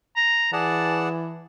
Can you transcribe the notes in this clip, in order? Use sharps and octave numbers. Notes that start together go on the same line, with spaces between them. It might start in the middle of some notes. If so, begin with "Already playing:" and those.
A#5
E3 G#4 D5 F#5 A5